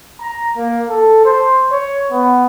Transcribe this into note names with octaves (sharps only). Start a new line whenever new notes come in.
A#5
A#3
A4
C5
C#5
B3